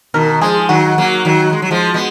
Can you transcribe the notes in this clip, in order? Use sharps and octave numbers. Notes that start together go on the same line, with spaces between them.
B2 D#3 A#4
F3 G#3 G#4
D#3 F#3 F#4
F#3 A#3
D#3 F#3
G#3
F#3
F3 G#3
G#3 B3